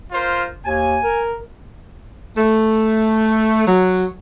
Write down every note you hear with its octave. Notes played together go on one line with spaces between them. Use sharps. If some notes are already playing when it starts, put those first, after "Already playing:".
F4 A#4 C5
D#2 G#5
A#4
A3
F#3